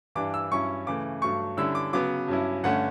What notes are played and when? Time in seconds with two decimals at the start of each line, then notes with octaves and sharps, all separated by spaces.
0.15 G2 E3 G3 D4 D6
0.34 E6
0.51 G2 F#3 C#4 E4 C#6
0.87 C#3 E3 A3 D6
1.21 G2 F#3 A3 C#6
1.57 D3 G3 C#4 E4 E6
1.75 D6
1.93 C#3 F#3 B3 D6
2.28 G2 F#3 C#4 E4
2.64 G2 D3 A3 C#4 F#5